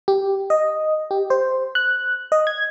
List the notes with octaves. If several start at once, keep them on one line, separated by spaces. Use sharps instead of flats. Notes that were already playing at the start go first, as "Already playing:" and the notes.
G4
D#5
G4
C5
F#6
D#5
G#6